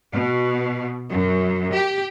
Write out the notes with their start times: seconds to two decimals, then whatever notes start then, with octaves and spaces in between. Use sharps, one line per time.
0.12 B2
1.09 F#2
1.73 G4